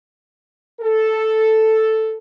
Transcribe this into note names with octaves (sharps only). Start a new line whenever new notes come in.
A4